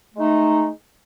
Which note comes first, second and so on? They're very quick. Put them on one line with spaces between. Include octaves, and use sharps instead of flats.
A3 G#3 D#4